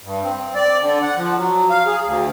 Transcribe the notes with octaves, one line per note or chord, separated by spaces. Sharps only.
G2
C4
D5
D3
F#5
F3
F#3
F5
G#4
D2